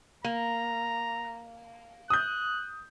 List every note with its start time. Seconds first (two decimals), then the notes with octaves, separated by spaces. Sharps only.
0.24 A#3 A#5
2.10 D#6 F#6 G6